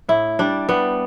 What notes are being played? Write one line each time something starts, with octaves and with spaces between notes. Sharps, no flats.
A2 E4
G3 D4
G3 B3